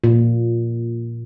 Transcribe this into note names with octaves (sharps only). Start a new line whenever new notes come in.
A#2